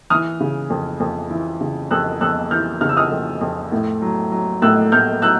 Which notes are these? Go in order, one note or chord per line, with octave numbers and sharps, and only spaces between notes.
E3 D#6 F6
C#3
F2
F2
E3
C#3
F2 E6 F#6
F2 E6 F#6
E3 F6 G6
C#3 F6
E6
D#6 F6
F2
F2
A2
F#3
F#3
A2 E6 F#6
A2 F6 G6
F#3 E6 F#6